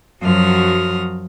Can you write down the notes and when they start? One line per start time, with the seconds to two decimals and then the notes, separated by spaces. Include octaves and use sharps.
0.22 F#2 F3 F#3 F#4 D#6 F6